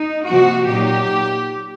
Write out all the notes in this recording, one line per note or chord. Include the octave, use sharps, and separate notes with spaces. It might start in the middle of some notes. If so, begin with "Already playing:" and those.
Already playing: D#4
C3 F3 A#3 F#4
A#2 F#3 A#3 D#4 G4